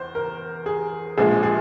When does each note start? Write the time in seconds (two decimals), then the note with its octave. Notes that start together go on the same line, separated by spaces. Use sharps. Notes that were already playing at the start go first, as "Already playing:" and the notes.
Already playing: F1 E2 C5
0.15 A#4
0.66 G#4
1.18 A#1 A#2 F3 G#3 G#4
1.43 G#4